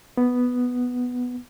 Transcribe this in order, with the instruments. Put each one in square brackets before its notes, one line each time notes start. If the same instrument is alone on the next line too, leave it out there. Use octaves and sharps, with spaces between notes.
[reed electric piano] B3